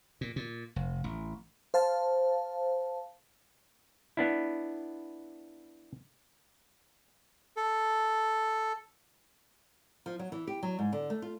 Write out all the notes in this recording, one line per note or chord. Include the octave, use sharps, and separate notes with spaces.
A#2
A#2
F1
A1
C5 F5 A5
B3 D4 E4
A4
F3
F#3
E3
G4
F#3
G#2
D3
A3
F4